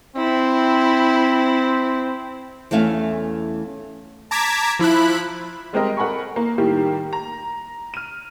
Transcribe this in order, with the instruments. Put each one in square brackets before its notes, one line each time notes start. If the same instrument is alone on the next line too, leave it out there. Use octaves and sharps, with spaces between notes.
[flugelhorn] C4 [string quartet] E4
[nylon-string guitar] E2 E3 A3 C#4 F5 G#5
[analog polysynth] A5 A#5 D6 G#6 B6
F3 E4 B5 F#6
[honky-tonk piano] G3 G#3 C4 G4 A#4 D#5
A4 A#4 F#5 G#5 B5 C#6
A#3
A2 D#3 G3 A#3 G4
A#5
F6 D#7